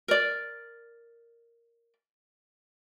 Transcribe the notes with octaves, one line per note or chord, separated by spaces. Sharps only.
A#4 D5